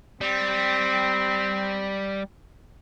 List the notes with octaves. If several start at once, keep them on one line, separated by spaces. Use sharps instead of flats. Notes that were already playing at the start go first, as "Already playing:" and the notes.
G3 C4